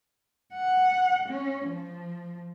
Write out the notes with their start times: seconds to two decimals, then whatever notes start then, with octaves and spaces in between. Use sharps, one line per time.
0.54 F#5
1.29 C#4
1.66 F3